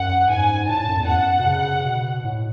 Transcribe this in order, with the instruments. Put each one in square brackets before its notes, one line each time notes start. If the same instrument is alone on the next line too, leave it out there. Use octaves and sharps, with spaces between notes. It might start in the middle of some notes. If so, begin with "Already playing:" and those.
Already playing: [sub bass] F#2 [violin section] F#5
[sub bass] G#2 [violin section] G#5
[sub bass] A2 [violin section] A5
[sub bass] A2
F#2
E2
[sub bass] F#2 [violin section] F#5
[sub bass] B2
C#3
B2
A2